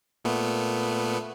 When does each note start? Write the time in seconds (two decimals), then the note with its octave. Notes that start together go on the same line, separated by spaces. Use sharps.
0.25 A#2 A3 B3